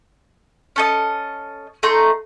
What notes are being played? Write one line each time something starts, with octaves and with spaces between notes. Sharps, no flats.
C#4 A4 D#5
A3 D#4 A#5 C6